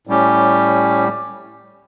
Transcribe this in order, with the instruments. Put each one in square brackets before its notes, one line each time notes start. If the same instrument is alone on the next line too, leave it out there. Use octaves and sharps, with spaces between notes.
[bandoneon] A2 G3 C#4 G4